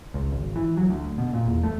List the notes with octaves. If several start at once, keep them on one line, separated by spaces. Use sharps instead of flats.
C#2
G#1
E3
F#3
D2
B2
A#2
E2
A3